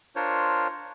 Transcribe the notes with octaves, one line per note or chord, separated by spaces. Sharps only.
D4 F4 A#4 C5 C#5